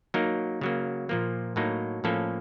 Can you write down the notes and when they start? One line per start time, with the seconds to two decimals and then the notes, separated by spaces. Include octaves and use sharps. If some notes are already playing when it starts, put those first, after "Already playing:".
0.14 F#3 A#3 D#4 A#4
0.61 C#3 F#3 A#3
1.09 A#2 F3 A#3
1.56 A2 F#3 A#3 D#4
2.04 A2 F3 A#3 C#4 A4